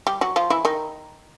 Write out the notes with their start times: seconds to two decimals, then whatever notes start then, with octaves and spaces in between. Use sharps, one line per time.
0.07 G3 G4
0.21 F#3 F#4
0.36 F3 F4
0.50 E3 E4
0.65 D#3 D#4